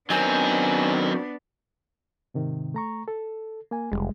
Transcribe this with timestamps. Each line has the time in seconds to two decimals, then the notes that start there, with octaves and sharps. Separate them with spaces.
0.10 F#3 B3 C4 D4 D#4 A#4 G#5
2.34 G#2 C3 D#3
2.74 A3 A#5 C#6
3.08 A4
3.71 A#3 G#5
3.92 F1 C#2 G3 G#3